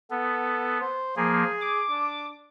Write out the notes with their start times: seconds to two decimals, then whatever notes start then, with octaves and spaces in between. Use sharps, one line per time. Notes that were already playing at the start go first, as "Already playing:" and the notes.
0.11 B3 A4
0.80 C5
1.17 F3 A#3 G#4
1.62 D6
1.90 D4